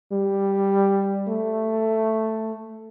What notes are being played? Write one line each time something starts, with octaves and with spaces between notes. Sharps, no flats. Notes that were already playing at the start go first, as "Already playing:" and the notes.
G3
A3